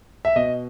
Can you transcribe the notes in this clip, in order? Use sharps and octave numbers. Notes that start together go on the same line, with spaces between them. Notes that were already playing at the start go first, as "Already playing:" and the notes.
E5
B2 D#5